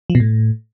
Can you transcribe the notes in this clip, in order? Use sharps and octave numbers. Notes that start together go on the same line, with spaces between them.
F3
B2
A2